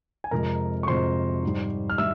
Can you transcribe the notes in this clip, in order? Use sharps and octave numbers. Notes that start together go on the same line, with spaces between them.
G#5
F2 C3 F3 G#3 A#4 A#5
C#6
F2 C3 F3 G#3 C5 C6
G#2 G3
F6
G3 E5 E6